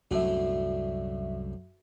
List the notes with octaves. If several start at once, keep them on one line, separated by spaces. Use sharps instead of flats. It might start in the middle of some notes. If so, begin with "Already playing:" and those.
C2 F#2 A2 D3 F#4 E5